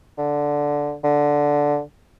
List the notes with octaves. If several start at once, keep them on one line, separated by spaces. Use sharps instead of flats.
D3
D3